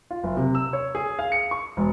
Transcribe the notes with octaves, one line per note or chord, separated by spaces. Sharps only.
F4
F#1
C3
E6
C#5
G#4
F5
C#7
C#6
E1